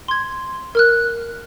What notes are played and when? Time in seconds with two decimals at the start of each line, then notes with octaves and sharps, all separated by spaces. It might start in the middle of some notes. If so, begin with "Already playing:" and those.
0.08 C6 G#6
0.75 A#4 F6 F#6